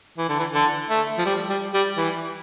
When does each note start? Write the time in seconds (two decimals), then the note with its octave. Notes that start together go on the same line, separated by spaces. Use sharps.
0.18 E3
0.29 D3
0.39 E3
0.54 D3
0.90 A3
1.18 F3
1.26 G3
1.50 G3
1.74 G3
1.97 E3